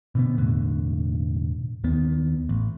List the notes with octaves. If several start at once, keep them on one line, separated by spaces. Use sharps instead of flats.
B2 D3 B3
E1 A2 D3
D#2 D#3 B3
A1